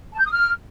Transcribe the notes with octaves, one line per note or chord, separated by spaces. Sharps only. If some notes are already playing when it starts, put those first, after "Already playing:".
A5
G6
D#6
F6